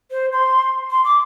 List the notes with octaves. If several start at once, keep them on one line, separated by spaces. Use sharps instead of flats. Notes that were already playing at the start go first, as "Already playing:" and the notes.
C5
C6
C6
D6